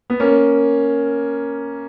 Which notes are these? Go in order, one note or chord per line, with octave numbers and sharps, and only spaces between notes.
B3
A#3 C#4